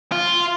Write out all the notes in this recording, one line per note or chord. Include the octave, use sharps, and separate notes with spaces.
F4